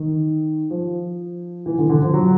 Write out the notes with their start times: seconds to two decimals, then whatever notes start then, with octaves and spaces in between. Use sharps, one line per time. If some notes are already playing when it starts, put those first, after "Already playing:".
Already playing: D#3
0.70 F3
1.66 E3
1.78 D3
1.89 D3
2.02 F3
2.13 F#3